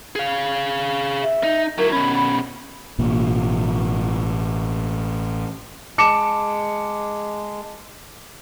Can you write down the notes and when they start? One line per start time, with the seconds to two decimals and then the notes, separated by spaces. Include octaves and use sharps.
0.16 G#4 F5
1.23 E5
1.44 D#4
1.78 F#3 E4 A#4
1.92 B2 C#4 B5
2.98 A1 B2 A#3
5.98 G#3 A5 D6 C#7 E7